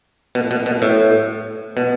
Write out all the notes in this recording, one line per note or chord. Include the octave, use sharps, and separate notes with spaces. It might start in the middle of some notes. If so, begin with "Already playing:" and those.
B2
B2
B2
A2
B2